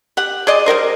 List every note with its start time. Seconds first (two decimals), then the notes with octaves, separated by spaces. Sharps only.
0.17 G4 F#5
0.47 G#4 C5 D5 D#5
0.66 G3 F#4 A#4 C5